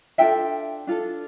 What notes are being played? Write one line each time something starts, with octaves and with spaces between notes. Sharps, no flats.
D4 F4 A4 E5 G5
D4 F4 A4